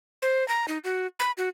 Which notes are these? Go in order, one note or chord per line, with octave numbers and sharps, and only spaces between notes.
C5
A#5
D#4
F#4
B5
F#4